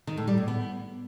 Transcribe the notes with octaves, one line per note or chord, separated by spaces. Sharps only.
D#3
A2
G3
A2
B3